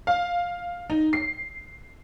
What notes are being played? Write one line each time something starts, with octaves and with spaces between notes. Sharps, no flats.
F5
D#4
C7